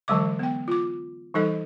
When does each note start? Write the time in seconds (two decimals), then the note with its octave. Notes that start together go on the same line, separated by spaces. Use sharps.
0.08 D3 E3 F#3 G#3 D#5 D6
0.39 B3 G5
0.68 F4 D6
1.34 E3 G3 D#4 A4 D#5